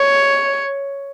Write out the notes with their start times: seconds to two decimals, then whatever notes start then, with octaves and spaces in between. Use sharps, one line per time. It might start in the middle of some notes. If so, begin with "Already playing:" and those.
Already playing: C#5